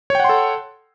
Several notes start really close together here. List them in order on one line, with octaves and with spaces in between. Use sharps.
C#5 G5 F#5 C6 A4